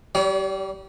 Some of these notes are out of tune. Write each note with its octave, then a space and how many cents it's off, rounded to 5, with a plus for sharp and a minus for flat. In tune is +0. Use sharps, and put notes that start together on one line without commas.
G3 -20 C#5 +45